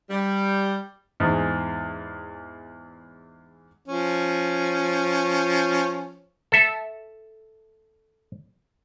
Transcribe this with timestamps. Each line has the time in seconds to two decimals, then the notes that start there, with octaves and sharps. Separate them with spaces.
0.10 G3
1.20 E2 G#2
3.88 F3 C#4
6.52 A4 E5